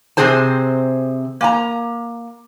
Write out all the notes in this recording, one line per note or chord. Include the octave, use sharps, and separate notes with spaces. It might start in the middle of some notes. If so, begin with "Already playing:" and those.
C3 F3 C4 G#4 C5 A5
A#3 G#5 A#5